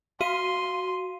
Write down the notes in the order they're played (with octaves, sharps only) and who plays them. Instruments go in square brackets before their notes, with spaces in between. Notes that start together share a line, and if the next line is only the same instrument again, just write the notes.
[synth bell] F#4 F5 D#7 [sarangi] C6